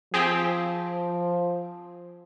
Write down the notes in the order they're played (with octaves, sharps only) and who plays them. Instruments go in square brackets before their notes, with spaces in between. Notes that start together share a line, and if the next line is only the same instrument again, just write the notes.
[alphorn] F3 [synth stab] C4 G4 G#4